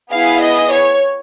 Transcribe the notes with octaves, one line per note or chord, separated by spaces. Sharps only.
B3 E4 G#4 F5
D#5
C#5